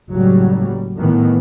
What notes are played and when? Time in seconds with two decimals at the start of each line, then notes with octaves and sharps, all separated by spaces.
0.10 F#1 A2 F#3 G3
0.98 A2 D#3 E3 B3